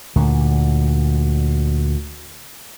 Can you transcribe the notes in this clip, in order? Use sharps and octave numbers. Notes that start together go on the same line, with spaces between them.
D2 A#2 D3